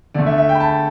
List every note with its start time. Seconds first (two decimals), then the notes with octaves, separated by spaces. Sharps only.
0.14 D3 A3 D5
0.26 E5
0.38 E5
0.49 G5
0.55 B5
0.60 A5